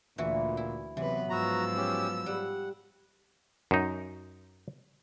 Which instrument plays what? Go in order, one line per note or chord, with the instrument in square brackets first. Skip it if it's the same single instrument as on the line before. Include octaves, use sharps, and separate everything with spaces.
[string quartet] D2 [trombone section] A#2 [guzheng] E3 E4 F#4
[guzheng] E4
[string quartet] C3 B4 [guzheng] E3 [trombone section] F#3 B3
[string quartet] G#2 F3 E6 [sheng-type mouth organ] F#4 A#5
[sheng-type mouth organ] C#4 G4
[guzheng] G3 [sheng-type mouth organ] F#5
[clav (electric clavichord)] F#2 D#4